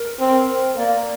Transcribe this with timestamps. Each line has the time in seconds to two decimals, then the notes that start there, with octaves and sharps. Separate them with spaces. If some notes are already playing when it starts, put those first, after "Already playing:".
Already playing: A#4
0.20 C4
0.77 A#3 D5